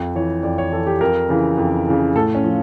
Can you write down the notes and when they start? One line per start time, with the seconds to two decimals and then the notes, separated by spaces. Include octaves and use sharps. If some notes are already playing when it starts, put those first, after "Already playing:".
Already playing: F2
0.15 E3 C#5
0.43 F2 D5
0.58 C#5
0.72 E3 A4
0.87 G4
1.01 F2 A#4
1.29 C#3 E3
1.58 F2
1.87 C#3 E3
2.15 A2 A4
2.35 C#4
2.44 F3